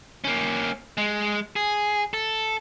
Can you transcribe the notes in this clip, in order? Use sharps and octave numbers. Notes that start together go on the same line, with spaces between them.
A#3 C#4
G#3
G#4
A4